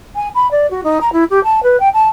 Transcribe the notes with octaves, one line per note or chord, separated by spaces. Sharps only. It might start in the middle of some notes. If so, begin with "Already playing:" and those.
G#5
B5
D5
F#4
D#4
A#5
E4
G4
A5
B4
G5
A5